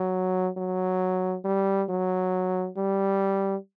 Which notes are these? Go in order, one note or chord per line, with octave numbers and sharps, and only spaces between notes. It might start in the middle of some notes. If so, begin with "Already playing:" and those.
Already playing: F#3
F#3
G3
F#3
G3